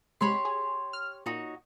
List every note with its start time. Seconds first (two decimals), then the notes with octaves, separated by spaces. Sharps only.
0.21 C3 G#3 G4 C#5 B5 C6
0.45 G#4
0.93 F6
1.26 A#2 D#4 F#4 C#5